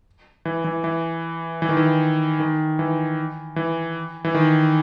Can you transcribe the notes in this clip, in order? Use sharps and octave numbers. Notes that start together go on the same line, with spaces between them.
E3
E3
E3
E3
D#3
E3
D#3
E3
E3
E3
D#3